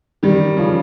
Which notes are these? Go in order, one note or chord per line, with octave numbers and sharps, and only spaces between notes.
D#3 G3
C#3 F3